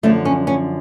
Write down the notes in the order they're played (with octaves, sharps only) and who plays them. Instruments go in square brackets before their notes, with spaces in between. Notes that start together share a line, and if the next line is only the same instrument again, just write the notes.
[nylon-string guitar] F#2 D3 F3 A3
C#4
C#4